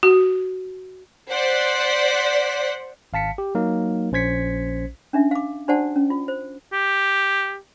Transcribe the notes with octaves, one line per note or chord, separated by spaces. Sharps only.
F#4
C5 D5 F#5 B6
G#1 F5 A5 B6 C#7
G4
F#3 A#3 D#4 A#4
A#1 C#4 C5 G#6 B6 C#7
C#4 D4 E5
F5 D6
D4 F#4 C5 D5 F#5 A5
C#4
F4
C5
G4